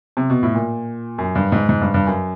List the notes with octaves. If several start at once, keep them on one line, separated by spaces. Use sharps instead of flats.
C3
B2
A2
A#2
F#2
G2
G#2
G#2
G2
G2
F#2